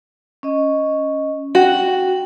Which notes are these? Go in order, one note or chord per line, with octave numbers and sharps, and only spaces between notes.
C#4 D#5
F#4 G5